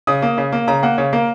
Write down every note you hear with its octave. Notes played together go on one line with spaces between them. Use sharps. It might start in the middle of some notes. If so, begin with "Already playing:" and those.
C#3 D#6
A#3
C#3
A#3
C#3 A#5
A#3 F#5
C#3 C#5
A#3 A#4